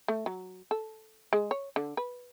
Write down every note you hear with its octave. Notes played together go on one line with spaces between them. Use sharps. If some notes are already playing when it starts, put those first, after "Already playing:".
A3
F#3
A4
G#3
C#5
D3
B4